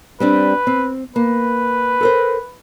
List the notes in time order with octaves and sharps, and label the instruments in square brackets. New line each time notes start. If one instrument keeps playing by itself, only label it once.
[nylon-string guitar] G3 C4 D4 [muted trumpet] B4
[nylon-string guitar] C4
[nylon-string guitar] A#3 [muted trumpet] B4
[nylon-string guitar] A4 A#4 C5